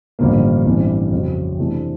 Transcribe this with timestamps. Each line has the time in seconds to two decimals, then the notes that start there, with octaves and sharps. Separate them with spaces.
0.19 A1 G2 D3 F3 A#3
0.66 A1 G2 E3 A3 C4
1.12 F2 C#3 F#3
1.59 C3 E3 A3 D4